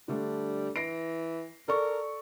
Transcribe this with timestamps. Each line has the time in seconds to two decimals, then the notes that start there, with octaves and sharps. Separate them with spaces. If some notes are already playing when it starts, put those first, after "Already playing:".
0.08 D3 G3 A3 D4
0.76 E3 A#6 C7 D7
1.68 A4 A#4 D5 C#6